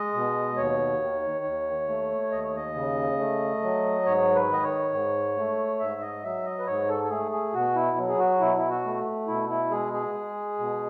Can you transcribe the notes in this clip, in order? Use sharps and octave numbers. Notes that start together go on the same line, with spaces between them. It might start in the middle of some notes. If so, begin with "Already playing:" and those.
Already playing: G#3 D#5
B2
D#2 C#5
D#3
D#2
A3
D#2 D#5
C#5
D#5
C#3
A3
F#3
G#2 C#5
B4
D#3 D#5
C#5
G#2
A3
G#2 E5
D#5
F#3 E5
D#5
B4
G#2 C#5
A4
A4
A3 G#4
G#4
B2 F#4
E4
F#3
G#4
F#4
B2 E4
E4
F#4
A3
B2 E4
E4
G#3 G#4
G#4
G#3
B2